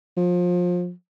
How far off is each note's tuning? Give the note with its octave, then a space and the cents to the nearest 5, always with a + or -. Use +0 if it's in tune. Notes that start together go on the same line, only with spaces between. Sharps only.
F3 +25